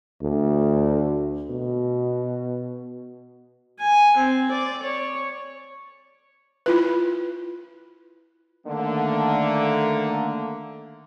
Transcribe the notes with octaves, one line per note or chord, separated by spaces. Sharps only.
D2
B2
G#5
C4
D5
C#5
E4 F4 B4
D3 D#3 A3 A#3